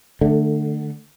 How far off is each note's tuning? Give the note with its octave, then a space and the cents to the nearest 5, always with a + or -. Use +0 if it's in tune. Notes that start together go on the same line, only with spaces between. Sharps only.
D3 +25 A3 +5